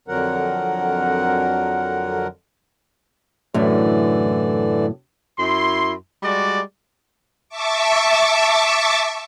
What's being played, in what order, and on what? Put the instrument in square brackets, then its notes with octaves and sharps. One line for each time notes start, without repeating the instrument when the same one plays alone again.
[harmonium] F2 D3 F#3 A#4 F#5
[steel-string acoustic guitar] F#2 A2 [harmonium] D3 E3 D5
[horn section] F#2 E4 C6
G3 G#3 F#4 D5
[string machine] E5 A5 C#6 D6